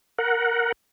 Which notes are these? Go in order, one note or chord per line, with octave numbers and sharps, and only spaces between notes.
A#4 F#5